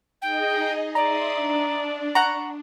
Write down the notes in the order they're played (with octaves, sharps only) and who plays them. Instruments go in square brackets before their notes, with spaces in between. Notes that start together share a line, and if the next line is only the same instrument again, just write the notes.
[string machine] D#4 G#4 D#5 [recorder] G5
[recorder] D5 [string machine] E5 C6 D#6 [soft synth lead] A#5
[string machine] D4
[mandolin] F#5 A#5 [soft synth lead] C#6